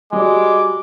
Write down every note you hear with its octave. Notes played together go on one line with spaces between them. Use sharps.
G3 G#3 F#4 D5 D6